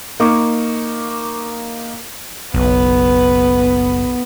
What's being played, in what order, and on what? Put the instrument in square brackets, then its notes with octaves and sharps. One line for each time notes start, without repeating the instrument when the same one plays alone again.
[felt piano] A#3 D#4 C#6 D6
[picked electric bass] F#1 [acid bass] B1 [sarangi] B3 [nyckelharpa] B4